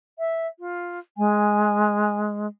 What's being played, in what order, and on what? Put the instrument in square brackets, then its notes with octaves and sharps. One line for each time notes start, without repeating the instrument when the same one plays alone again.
[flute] E5
F4
[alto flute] G#3 [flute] G#5